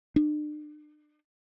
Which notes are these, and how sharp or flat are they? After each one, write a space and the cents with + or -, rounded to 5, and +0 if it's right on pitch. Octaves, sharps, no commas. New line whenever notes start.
D4 +40